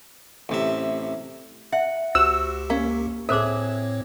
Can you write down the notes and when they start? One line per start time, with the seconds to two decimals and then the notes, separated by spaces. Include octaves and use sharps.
0.49 A1 C3 E5
1.72 E5 F#5
2.15 C#2 F#4 G4 C5 E6
2.70 A#3 C#4 F5
3.29 A2 C4 G#4 A4 C5 C#5 E5 D6